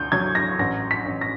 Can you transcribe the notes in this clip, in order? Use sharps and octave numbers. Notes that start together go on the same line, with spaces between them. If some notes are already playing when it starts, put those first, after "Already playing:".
Already playing: D2 G6
F#3 G#6
A#6
A1 A#6
B6
A1
A#6